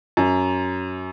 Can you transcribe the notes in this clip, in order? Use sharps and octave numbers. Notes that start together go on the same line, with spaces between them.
F#2